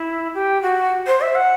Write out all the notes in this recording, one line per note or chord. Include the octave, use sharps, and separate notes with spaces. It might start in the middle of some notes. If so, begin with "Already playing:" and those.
Already playing: E4
G4
F#4
C5
E5
F#5